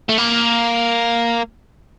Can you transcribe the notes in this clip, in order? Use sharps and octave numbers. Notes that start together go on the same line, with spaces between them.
A3
A#3